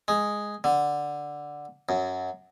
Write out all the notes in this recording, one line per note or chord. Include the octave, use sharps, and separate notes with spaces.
G#3
D3
F#2